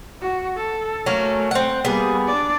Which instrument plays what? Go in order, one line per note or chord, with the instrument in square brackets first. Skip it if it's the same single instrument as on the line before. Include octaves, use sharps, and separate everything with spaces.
[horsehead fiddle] F#4
A4
[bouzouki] F#3 A#3 C#4 [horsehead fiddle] A3
[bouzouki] C4 F#5
[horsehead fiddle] G3 A#3 [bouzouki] B3 G#4
[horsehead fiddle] D4 D5